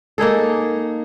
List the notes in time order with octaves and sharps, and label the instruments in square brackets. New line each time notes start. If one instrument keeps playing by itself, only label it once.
[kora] A#3 D#4 G#4 A4